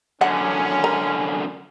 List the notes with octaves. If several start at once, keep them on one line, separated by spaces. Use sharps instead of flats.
F#2 D3 C#4 F#5
A#4